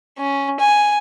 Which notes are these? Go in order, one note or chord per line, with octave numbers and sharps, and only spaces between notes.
C#4
G#5